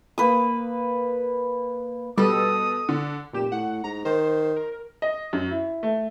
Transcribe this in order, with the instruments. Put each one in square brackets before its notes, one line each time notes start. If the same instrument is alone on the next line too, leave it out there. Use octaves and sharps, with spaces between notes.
[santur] A#3 B4 D#6
[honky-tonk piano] B2 [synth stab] G3 [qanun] A4 [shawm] D#6
[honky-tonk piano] D3
[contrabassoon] F1 [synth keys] A#2 G4 E7
[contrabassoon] A2 [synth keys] F#5
[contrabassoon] G#2 [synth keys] A#5
[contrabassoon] D#3 [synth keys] C5
[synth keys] A#4
[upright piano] D#5
F#2
E4
A3